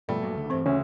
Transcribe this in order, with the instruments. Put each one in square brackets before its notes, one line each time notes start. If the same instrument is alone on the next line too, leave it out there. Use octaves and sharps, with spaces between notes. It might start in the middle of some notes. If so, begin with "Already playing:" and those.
[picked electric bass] G2 B2 F3 [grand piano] A3 [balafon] D5 G5 B5
[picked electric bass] G2 A#2 F#3
C#2 D3
[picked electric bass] G2 C4 [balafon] E3 C5
[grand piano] D2 [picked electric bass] C#3 [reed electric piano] C#4